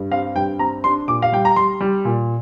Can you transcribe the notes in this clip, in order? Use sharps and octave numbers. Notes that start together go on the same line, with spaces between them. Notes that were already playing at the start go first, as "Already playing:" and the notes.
Already playing: G2
C4 F5
G2 G5
C4 A#5
D4 C6
A#2 D6
F5
G3 G5
A#5
G3 C6
G3
A#2